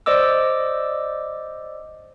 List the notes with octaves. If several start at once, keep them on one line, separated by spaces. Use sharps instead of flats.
C5 D5 D#5 D6 E6